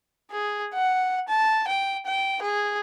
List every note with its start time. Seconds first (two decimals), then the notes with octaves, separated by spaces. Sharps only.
0.31 G#4
0.74 F#5
1.29 A5
1.68 G5
2.06 G5
2.42 G#4